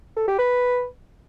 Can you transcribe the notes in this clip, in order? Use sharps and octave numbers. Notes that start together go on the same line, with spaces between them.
A4
G4
B4